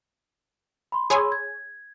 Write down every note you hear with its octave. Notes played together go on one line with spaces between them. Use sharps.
B5 C6
G#4 C#5 G#5 B5 C6 E6
G#6